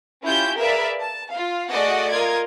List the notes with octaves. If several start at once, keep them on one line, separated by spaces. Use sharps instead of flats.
C#4 E4 F4 G4 G6
G#4 A#4 B4 D5 E5 F5
A5
F4 F5
A3 F#4 G#4 D5 D#5 F#5
F4 A#4 D#5 G#6